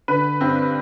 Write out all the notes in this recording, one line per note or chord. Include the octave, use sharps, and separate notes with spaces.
D3 B4
G2 C4